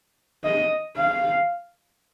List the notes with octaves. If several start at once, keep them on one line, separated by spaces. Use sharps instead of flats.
D#5
F5